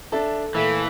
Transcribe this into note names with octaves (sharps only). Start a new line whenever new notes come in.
D4 A4 E5 A5
A#2 E3 A3